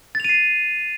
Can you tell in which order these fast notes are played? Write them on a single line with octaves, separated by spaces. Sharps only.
A6 F7 D#7 C7